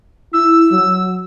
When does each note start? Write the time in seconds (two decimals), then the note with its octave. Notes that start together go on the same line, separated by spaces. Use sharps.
0.33 E4 E6
0.71 F#3